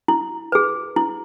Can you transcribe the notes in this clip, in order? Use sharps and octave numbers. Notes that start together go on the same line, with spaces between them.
E4
G#4 B4
E4